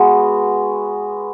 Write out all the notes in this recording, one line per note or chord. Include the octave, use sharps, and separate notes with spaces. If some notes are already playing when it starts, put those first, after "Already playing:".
Already playing: G#3 B3 F#4